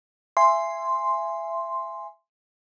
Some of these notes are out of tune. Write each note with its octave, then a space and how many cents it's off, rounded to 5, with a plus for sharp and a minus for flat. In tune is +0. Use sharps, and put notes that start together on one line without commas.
E5 +25 G#5 +0 C6 +0